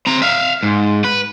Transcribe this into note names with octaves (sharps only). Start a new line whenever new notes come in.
C4 A#5
E5 F5
G#2
B4